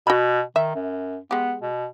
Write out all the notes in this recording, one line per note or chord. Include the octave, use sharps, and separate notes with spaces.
B2 F#4 B5
D#3 E5
F#2
G#3 B3 G4
B2